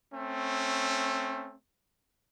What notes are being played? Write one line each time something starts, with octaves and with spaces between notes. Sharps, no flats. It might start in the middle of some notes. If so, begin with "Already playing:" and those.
A3 C4 C#4